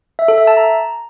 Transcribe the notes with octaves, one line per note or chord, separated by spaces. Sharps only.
E5
A4
E5
A5
A#5